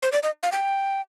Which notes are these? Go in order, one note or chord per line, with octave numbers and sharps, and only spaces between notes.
C5
D5
D#5
F5
G5